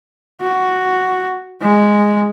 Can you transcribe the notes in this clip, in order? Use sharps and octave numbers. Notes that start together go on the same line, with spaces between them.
F#4
G#3